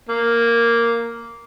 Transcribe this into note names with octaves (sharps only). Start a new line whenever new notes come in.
A#3